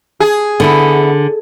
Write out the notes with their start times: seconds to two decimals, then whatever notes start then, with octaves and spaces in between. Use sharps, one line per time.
0.20 G#4
0.60 D3 B3 E4